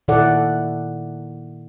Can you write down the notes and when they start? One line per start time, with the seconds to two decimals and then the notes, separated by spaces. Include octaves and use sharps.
0.08 A#2 D#3 E4 A4 D5 F#5